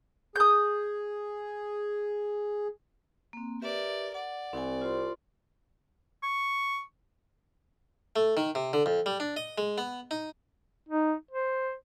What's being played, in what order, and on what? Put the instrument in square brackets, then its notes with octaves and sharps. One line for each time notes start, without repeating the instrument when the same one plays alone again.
[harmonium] G#4 [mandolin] D#6 G6
[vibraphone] A#3 C4
[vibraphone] G4 B4 E5 [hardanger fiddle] A#4 D5
[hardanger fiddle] D5 [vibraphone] F#5
[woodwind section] C2 [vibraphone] C4 G#5
[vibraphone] F4 C5 C6
[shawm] C#6
[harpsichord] A3
D#3
C3
D3
F2
G3
D4
D#5
G#3
B3
D#4
[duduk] D#4
C5